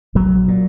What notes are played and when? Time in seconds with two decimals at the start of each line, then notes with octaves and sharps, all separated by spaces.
0.15 A#1 F#3
0.48 A#2